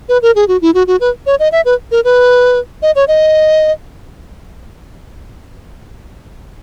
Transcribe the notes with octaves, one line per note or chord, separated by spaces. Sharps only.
B4
A#4
G#4
F#4
E4
F#4
F#4
B4
C#5
D#5
E5
B4
A#4
B4
D#5
C#5
D#5